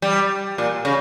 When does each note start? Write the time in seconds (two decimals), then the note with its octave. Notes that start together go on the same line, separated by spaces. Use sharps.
0.02 G3
0.58 A#2
0.85 C#3